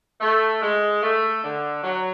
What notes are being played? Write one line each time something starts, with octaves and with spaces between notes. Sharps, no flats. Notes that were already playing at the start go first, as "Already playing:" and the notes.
A3
G#3
A3
D3
F#3